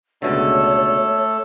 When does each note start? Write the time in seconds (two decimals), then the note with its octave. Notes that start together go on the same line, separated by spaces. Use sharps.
0.22 C#2 B2 D3 A3 A4 C#5